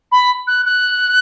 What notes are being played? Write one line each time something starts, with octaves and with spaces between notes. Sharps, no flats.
B5
F#6
F#6